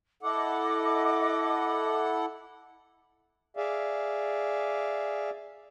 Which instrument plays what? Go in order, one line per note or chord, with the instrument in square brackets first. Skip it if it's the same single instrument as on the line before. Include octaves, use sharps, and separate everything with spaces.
[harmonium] E4 A4 F#5 [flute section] D#5 D6
[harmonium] G#4 D5 E5 F5